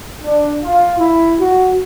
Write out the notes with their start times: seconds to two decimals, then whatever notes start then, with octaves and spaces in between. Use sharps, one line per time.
0.24 D4
0.62 F4
0.98 E4
1.39 F#4